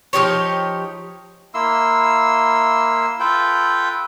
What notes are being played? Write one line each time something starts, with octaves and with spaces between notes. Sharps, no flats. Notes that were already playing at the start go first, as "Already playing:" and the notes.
F3 D#4 G4 C#5
A#3 E4 C6 E6
F4 A4 B4 G5